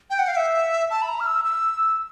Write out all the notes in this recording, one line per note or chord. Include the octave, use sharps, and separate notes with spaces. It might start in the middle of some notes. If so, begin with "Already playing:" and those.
G5
F#5
F5
E5
A5
B5
A#5
F6
E6
E6